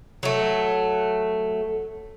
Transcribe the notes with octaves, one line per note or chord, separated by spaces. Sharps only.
F#3 A3